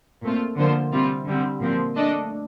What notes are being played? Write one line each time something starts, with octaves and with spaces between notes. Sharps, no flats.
A#2 A3 C4 F4
D3 F3 A#3 F4 C5
C3 G3 C4 F4
D3 G3 C4
A#2 F3 C4
A3 D4 A4 D#5